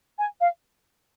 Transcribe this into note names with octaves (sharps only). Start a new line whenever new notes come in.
G#5
F5